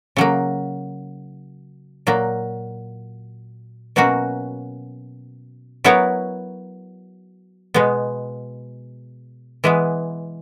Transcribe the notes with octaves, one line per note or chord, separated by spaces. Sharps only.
C#3 F#3 A#3
A#2 F#3 A#3
B2 F#3 A#3 C#4 F#4
F#3 B3 E4 A#4 C#5
B2 G#3 B3
E3 G#3 B3 E4